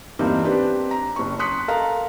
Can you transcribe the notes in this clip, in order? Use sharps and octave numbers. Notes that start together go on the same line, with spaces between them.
E2 G2 A#3 C4 D#4 E4
C4 D4 G4 B4
A#5
F#1 C#6
C6 D#6 F#6 B6 C#7
A4 A#4 F5 A5 A#5